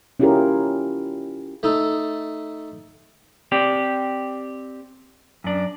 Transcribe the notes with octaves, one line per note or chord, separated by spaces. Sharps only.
C#4 E4 F4 G4 G#4 A#4
A3 D#4 A4
C4 G4 D5
F#2 D4